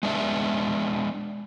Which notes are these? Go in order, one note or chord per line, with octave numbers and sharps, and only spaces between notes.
G#3 B3 D4 E5